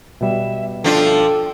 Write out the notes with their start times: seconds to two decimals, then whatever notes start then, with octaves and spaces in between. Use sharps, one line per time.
0.21 B2 G3 E5
0.84 F3 D4 F4 A4 G5